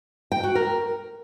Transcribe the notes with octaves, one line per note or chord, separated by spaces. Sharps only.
G5
F#4
A#4